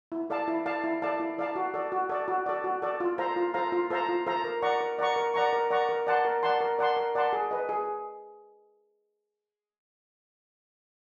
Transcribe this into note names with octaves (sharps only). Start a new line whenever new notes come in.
E4
A4 D5 F5 A5
E4
A4 D5 F5 A5
E4
A4 D5 F5 A5
E4
A4 D5 F5 A5
F#4
A4 D5
F#4
A4 D5
F#4
A4 D5
F#4
A4 D5
F4
A4 C5 F5 A#5
F4
A4 C5 F5 A#5
F4
A4 C5 F5 A#5
F4
A4 C5 F5 A#5
A#4
D5 F#5 A#5 C#6
A#4
D5 F#5 A#5 C#6
A#4
D5 F#5 A#5 C#6
A#4
D5 F#5 A#5 C#6
A#4
D5 F#5 A5 C6
A#4
D5 F#5 A5 C6
A#4
D5 F#5 A5 C6
A#4
D5 F#5 A5 C6
G#4
B4 D#5
G#4